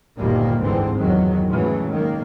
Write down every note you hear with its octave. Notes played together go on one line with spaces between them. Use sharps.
G1 D2 A#2 D#3 G3 A#3
G1 G#2 D3 E3 C4
G1 E2 D#3 F#3
G#2 C#3 E3 F#3 A3
D#3 A#3